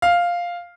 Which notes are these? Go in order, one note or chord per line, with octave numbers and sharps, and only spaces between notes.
F5